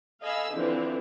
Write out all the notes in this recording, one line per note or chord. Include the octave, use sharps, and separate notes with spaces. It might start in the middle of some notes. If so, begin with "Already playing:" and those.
A4 D#5 F5 G#5 B5 E6
D3 E3 F3 C4 D4